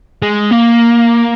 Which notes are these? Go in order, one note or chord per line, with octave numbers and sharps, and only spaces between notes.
G#3
A#3